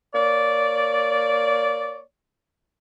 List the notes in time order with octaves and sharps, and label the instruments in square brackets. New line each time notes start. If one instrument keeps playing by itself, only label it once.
[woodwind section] A#3 C#5 D5